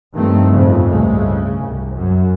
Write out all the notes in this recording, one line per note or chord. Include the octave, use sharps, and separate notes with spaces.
G2 D#3 F3 A3 C4
F2 A2 C#3 F3
C#2 G2 A#2 G#3 A3
C#3
C2
F#2